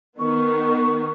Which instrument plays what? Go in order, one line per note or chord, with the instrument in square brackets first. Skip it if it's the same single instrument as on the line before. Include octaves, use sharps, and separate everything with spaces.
[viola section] D#3 B3 [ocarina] C#6